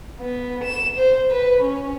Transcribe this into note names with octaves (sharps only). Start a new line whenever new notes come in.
B3
E7
C5
B4
C#4